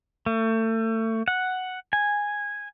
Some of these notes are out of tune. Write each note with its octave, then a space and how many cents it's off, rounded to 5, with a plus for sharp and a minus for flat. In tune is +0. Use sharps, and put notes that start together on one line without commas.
A3 +30
F#5 +0
G#5 -10